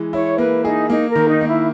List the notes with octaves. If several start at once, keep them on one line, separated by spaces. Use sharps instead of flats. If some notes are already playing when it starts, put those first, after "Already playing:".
Already playing: E3 G#3
E4 C#5
A#3 B4
D#4 G#4
A#3 D#4
A#4
D#3
D#4
A#3
E4